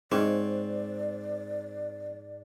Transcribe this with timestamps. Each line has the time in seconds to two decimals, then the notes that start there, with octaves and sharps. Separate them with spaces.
0.12 G#2 C4 C#5 D5